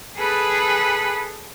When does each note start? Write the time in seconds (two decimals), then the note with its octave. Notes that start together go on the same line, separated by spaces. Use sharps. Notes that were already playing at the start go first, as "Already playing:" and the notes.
0.17 G#4 A4 B4 A5 B5